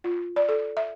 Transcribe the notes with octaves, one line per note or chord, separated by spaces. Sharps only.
F4
D5
A4
E5